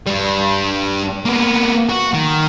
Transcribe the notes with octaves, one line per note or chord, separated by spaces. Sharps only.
G2 G3
A#3 B3
F#4
D#3